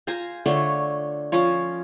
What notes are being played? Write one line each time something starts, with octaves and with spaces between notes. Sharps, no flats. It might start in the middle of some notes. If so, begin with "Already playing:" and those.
F4 C5 G#5 A#5
D3 A3 F4 C#5
F3 C#4 F4 C#5